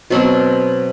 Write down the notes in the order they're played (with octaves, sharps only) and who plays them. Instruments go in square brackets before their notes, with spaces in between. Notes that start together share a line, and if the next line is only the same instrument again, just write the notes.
[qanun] B2 F#3 C4